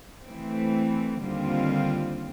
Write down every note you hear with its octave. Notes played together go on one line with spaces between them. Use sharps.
E3 A3 C4
D#2 D3 G3 C4 F4